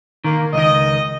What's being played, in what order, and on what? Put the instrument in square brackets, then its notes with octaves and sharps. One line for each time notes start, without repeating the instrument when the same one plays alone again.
[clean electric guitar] D#3 [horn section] A#3
[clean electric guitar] C#2 D#3 [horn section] D#5